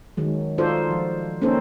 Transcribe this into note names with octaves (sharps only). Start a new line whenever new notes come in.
D#3 F#3 G#3
D#4 F4 F#4 A4 C5 D5
F3
A#3 C4 C#4 D#4 A4 C5